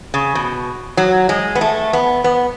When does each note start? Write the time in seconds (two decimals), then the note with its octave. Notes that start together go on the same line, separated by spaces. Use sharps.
0.14 C#3
0.35 B2
0.97 F#3
1.29 G#3
1.55 B3
1.61 A3
1.93 B3
2.24 B3